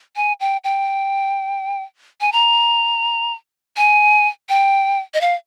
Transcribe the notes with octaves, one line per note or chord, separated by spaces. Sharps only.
G#5
G5
G5
G#5
A#5
G#5
G5
D#5
F5